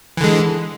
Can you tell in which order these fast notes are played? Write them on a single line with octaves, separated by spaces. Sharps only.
E3 D3 G#3